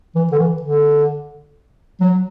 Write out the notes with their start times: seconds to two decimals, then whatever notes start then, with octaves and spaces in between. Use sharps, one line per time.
0.15 E3
0.32 D3
0.39 E3
0.62 D3
2.00 F#3